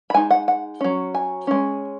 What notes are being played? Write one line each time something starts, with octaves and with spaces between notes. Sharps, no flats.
B5
G#3 D#4 G#5
F#5
F#5
F#3 C#4
G#5
G#3 C#4